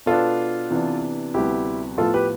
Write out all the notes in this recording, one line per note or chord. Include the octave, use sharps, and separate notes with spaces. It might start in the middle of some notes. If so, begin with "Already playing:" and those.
B2 B3 D4 F4 A4
C3 E3 B3 D4
D2 C3 G3 B3 E4 G4
A2 F3 B3 F4 A4
G4 B4